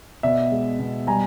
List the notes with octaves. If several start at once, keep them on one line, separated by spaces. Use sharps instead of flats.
B2 D5 E5
G#3
B2
G3 G#5 A#5